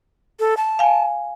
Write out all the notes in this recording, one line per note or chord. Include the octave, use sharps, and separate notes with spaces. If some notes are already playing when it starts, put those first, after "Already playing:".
A4
A5
F5 G#5